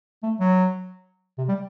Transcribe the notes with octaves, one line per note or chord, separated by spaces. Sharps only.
A3
F#3
C3
G3